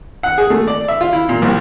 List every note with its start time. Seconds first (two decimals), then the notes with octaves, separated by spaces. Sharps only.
0.23 F#5
0.38 G#4
0.50 A3
0.68 D5
0.88 E5
1.01 F4
1.13 E4
1.29 A#2
1.42 C2